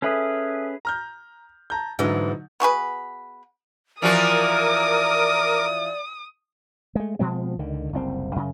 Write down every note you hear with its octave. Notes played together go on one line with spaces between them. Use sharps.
C#4 G#4 A4 B4 E5 D#6
A#5 F6 G6
A5 A#5 G6
G#2 D3 E3 F#3 D#4
B3 F#4 G#4 B4
E3 F3 F#4 A#4 D5 D6 D#6
G#3 A3
B2 F3 G#3 C4
C#2 D3 D#3
F#1 C2 C4
F#2 C#3